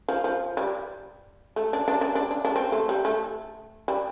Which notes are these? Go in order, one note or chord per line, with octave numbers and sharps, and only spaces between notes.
F3
F3
G3
A3
D4
D4
D4
D4
D4
D4
C4
A3
G3
A3
G3